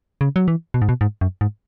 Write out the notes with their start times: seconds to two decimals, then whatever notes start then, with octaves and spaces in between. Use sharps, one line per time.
0.21 C#3
0.36 F#3
0.48 E3
0.74 B2
0.82 G#2
0.89 B2
1.01 G#2
1.21 F#2
1.41 G#2